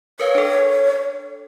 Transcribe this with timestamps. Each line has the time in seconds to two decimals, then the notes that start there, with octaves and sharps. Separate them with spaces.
0.20 A#4 B4 C#5 F5
0.35 D4 A4